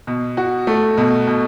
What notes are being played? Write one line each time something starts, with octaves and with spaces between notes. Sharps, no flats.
B2
F#4
A3
B2
B2